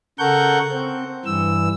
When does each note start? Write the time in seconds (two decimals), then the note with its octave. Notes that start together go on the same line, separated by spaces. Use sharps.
0.19 C#3 A4 A#4 F#5 C#6 G6
0.72 C4
1.25 G2 E3 E6